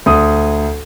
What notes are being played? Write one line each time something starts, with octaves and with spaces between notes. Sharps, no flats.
D2 D#6